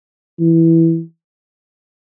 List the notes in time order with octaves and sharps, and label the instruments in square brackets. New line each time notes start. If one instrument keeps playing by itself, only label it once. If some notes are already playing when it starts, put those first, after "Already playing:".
[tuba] E3